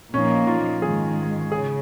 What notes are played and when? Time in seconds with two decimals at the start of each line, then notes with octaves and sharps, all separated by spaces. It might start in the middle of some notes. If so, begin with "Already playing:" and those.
0.13 A#2 F3 A#3 C#4 D#4
0.47 F4
0.82 G#2 D#3 G#3 G#4
1.51 C#3 G#4